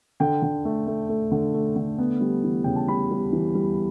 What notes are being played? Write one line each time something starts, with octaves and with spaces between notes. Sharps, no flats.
D3 G5
D3
A3
A3
A3
D3
A3
D3
B3
G3
E3
C#3 G5
A5
G3 B5
G3
E3
G3